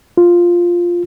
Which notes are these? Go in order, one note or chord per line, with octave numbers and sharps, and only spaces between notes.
F4